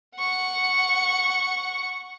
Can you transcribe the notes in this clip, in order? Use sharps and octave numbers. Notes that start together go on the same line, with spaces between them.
F#5 C#6